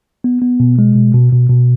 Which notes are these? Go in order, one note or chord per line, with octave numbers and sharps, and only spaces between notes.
B3
B3
B2
G#3
B2
B2
B2
B2